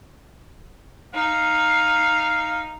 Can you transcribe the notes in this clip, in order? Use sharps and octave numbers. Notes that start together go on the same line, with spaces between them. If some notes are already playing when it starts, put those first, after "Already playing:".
D#4 F5